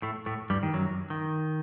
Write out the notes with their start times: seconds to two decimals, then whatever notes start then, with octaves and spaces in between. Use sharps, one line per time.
0.02 A2 A3
0.26 A2 A3
0.50 G2 G3
0.63 D#3
0.74 F#2 F#3
1.10 D#3